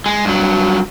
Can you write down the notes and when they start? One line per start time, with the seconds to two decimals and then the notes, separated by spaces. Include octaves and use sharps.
0.06 G#3
0.25 G2 F#3